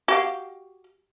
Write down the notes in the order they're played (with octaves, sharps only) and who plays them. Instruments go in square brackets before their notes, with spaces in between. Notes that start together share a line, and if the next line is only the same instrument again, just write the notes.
[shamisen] F#4 G4 F5